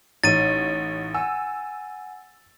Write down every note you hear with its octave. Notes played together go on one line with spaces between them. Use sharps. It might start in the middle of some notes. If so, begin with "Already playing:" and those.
A1 D#4 C#5 A6 D#7
F#5 G#5 E6